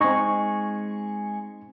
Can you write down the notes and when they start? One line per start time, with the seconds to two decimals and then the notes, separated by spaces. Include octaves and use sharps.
0.01 G#3 C4 D#4 C#6